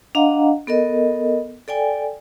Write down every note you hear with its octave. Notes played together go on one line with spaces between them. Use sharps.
D4 D#5 F5 F#5 A#5
B3 A4 A#4 D#5
A4 D5 G5 G#5